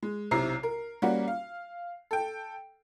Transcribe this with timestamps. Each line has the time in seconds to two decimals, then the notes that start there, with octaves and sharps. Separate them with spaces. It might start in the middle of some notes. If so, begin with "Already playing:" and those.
0.03 G#3
0.31 B1 C3 E4 A#5 C7
0.63 A#4
1.02 G3 A#3 C#4 F#4
1.28 F5
2.11 A4 G5